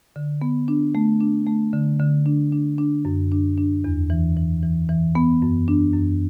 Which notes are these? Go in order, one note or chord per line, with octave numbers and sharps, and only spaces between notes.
D3
B3
D4
A3
D4
A3
D3
D3
D4
D4
D4
F#2
D4
D4
E2
E3
E3
E3
E3
B3
F#2
D4
F#2